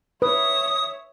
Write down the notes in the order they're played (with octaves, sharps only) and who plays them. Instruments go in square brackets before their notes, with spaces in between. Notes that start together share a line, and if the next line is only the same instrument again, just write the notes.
[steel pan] B4 [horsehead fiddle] C#5 E5 [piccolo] D#6